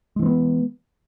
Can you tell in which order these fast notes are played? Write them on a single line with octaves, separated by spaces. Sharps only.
G#3 E3 C4 B3